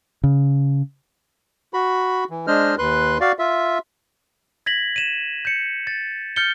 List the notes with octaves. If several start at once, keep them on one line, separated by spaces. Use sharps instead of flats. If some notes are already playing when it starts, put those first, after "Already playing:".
C#3
F#4 B5
E3
G#3 D4 C5 D#5 F6
D#2 B4 C6 F#6
F#4 D5 F5
F4 E5
G#6 A#6 B6 F#7
D#7 E7
G6 C#7
A6
F6 G6 A6 C#7 G7